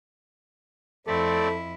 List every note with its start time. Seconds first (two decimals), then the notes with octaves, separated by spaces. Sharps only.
1.07 F2 A3 C4 E4 A4 D5